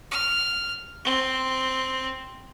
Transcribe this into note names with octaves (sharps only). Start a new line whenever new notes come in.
F6
C4